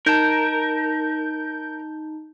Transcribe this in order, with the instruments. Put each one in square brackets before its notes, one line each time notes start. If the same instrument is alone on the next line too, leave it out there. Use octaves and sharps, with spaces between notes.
[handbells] D#4 A5 [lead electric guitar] A#4 [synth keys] G6